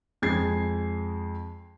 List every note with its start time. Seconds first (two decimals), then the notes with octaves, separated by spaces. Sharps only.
0.22 F2 G#3 G#6 C7